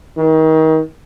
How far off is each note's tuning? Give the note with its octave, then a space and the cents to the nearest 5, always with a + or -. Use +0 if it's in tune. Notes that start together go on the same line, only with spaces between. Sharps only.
D#3 +30